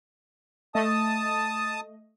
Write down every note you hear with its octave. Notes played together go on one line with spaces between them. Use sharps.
A3 D#5 A5 D#6